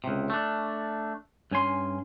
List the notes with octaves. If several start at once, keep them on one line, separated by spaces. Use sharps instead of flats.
C#2 C3
A3 D4
G2 C#4 G#5 C6